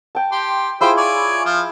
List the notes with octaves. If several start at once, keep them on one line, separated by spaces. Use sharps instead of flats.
G5 A5
G4 C6
E4 F4 G4 G#4 C5
C#5 D5 G#5
F3 F4